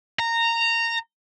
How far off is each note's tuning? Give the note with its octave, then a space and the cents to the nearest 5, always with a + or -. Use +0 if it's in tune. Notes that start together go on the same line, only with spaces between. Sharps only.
A#5 -15